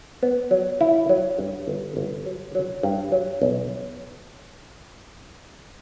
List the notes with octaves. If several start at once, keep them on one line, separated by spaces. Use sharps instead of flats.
B3
F#3
E4
F#3
G2
G1
G1
F#3
F#3
G2
F#3
B1